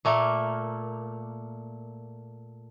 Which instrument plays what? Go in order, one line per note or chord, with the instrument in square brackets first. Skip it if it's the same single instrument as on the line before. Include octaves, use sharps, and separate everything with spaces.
[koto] A#2 A3 A#3